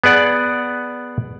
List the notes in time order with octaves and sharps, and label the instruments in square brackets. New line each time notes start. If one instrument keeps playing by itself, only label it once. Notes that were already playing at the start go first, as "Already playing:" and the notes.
[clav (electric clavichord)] B3 G#4 D5 F#5